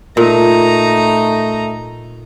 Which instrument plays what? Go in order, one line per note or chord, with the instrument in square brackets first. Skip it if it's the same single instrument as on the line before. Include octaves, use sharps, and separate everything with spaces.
[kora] A#2 [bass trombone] A3 [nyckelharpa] D#4 A#5